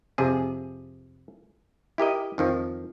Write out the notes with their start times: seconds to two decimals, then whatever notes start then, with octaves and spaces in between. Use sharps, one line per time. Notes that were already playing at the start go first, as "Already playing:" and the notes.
0.18 F2 C3 G#4
1.98 E4 G4 A#4 D#5
2.38 F2 D#3 F3